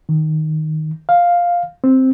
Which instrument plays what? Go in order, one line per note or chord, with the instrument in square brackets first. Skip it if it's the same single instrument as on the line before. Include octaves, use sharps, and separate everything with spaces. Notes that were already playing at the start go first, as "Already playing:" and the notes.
[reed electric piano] D#3
F5
C4